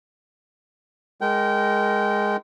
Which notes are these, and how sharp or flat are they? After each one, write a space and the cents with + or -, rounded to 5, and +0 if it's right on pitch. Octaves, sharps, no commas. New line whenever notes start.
G#3 +0 A#4 +0 G5 -25